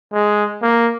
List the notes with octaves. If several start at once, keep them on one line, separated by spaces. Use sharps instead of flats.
G#3
A#3